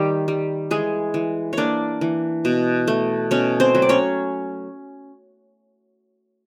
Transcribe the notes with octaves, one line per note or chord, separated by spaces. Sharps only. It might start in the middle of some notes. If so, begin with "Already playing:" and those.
Already playing: D#3 G3 G4
G3
E3 G#3 G#4
E3
A#3 D4 C#5 D5
E3
B2
A3
B2 C#4 C#5
C4 C5
F#3
D5
C#4 C#5